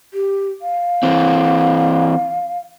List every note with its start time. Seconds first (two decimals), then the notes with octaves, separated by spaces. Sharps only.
0.14 G4
0.62 F5
1.03 E3 C4